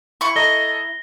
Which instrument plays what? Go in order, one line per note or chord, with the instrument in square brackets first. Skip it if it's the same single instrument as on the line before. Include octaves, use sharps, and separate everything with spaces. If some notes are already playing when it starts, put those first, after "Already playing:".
[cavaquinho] E4 C#6
[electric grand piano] A4 D#5 A#5 [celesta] A#6 G7